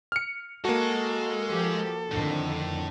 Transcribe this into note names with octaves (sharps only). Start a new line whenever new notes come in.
F6 C#7
G#3 A#3 F#4 A4
F3 G4
F2 A2 D3 D#3